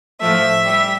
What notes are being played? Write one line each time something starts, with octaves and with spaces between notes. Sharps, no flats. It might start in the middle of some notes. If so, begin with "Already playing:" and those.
A2 F3 A3 E5
G3